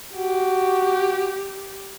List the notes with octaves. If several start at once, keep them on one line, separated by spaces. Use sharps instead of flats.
F#4 G4